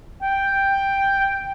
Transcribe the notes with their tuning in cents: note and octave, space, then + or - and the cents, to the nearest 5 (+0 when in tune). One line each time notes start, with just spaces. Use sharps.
G5 +5